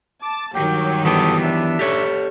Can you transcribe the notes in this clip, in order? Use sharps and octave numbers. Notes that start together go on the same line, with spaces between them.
A5 D6
G2 D#3 F#3 G4 G5
E3 B3 G4 A4 D#6
D4 E5
G4 A4 C#5